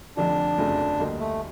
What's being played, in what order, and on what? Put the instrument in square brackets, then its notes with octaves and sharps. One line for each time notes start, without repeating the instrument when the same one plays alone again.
[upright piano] F1 F2 D3 F3 [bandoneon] D4
[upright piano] G1 F2 C#3 F#3 A3
D2 D3 G3 A#3 D#4
[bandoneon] A3